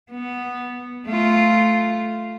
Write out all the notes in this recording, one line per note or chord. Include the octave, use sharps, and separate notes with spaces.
B3
A3 F4